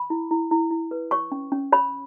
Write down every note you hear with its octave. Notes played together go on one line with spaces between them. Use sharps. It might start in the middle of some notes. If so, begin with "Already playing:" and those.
Already playing: B5
E4
E4
E4
E4
B4
C#5 C#6
C#4
C#4
C#5 B5